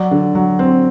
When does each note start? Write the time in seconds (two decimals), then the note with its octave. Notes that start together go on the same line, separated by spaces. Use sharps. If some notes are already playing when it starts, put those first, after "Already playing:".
Already playing: F#3 D5
0.11 D3
0.35 F#3
0.59 C4